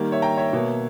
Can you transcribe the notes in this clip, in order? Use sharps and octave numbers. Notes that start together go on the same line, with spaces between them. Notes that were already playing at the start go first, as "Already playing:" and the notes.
Already playing: D#3 G3 A#3
C#5 E5
G5 A#5
C#5 E5
B2 A#3